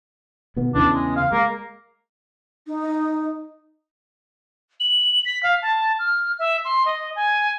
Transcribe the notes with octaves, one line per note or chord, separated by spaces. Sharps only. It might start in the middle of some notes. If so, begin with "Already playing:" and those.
B2 D#3 B3
E2 C#3 E3 D4
G#3
F5
G#3 A#3
D#4
F#7
B6
F5
A5
F6
E5
C6
D#5
G#5